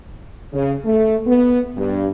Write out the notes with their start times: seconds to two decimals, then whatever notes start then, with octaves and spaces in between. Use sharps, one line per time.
0.53 C#3
0.85 A3
1.26 B3
1.77 G2